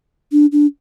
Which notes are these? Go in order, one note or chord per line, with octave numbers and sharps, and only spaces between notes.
D4
D4